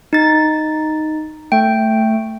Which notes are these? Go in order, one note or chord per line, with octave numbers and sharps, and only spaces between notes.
D#4 A6
A3 G5